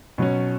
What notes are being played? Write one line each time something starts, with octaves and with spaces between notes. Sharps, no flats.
B2 F#3 C#4